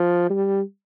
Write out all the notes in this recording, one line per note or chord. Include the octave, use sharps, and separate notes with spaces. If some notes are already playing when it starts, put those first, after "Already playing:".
Already playing: F3
G3